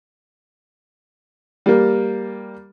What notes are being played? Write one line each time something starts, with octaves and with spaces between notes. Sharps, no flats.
G3 A#3